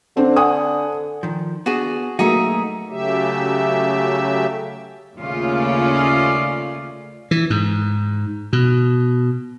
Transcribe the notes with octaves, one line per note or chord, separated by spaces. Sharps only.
D3 C4 D4 C5
F#5 G#5 D#6
D#3 F3
B3 D4 F#4 G#4
F#3 A3 A#3 D#4 F#4 G#4 E5
C#3 F#3 A3 G4 E5
D#2 C#3 A3 C#4 F4 D5
E3
G#2
B2